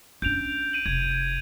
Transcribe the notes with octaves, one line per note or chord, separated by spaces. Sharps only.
C#4 D4 G6 D7 F7
D7 D#7 F#7
F1 G#6